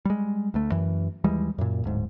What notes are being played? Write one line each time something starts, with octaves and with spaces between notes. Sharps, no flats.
G3 G#3
D2 A3
F#2 E3
D#2 E3 G3 G#3
F#2 A#2
D1 G#2